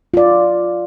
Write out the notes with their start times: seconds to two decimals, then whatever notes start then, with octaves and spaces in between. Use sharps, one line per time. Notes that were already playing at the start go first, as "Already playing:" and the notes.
0.14 F4 D5